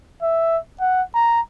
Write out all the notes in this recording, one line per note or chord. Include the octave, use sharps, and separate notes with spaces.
E5
F#5
A#5